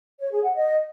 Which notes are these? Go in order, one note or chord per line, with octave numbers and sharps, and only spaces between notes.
C#5
G#4
F#5
D#5